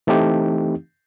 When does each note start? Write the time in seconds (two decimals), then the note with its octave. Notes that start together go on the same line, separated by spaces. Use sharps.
0.07 E3 A3 C4 D#4 G4